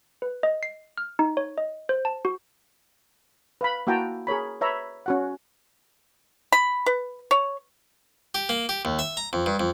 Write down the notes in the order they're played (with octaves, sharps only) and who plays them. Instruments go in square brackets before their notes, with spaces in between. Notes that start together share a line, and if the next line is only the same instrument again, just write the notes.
[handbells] B4
D#5
C7
F6
D#4
C#5
D#5
C5
A5
F#4
[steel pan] B4 F5 B5
A#3 E4 F#4 G5 A5 A#5
G#4 A#4 C#5 B5
B4 C#5 E5 A#5 B5
C#4 F#4 F#5
[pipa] B5
B4
C#5
[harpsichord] G4
A#3
G4
D#2
E5
A#5
F2
G2
F2